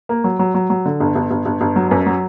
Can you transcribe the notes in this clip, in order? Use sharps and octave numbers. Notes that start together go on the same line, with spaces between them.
A#3
F#3
F#3
F#3
F#3
D3
G1
G1
G1
G1
G1
F#3
F#2
F#3